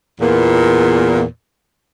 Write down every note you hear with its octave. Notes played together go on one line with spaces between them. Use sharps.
E2 A#2